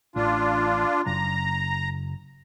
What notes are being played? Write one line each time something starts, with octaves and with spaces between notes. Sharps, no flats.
A1 D4 F4
F#1 A#5